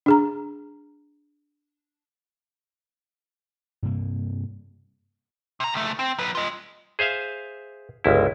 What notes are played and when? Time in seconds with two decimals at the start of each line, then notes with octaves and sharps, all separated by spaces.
0.06 D4 G#4 A#5
3.83 G2 C3 A#3
5.60 C3 A#5
5.74 C#2 A3
5.99 C4
6.18 F#3 B4
6.35 F4 D#5
6.99 G#4 C5 E5 F5
8.04 G1 C#2 E4